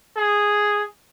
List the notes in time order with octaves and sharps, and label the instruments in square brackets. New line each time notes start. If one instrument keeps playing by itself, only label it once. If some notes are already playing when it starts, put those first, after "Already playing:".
[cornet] G#4